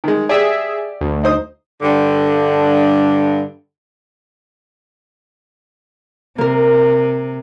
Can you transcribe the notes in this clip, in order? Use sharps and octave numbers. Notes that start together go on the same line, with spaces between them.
D#3 G#3
G4 G#4 D5 E5
D2
D#4 C5 D#6
G2 D3
C3 A#3 A#4